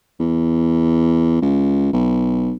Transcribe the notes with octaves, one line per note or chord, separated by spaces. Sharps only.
E2
C#2
B1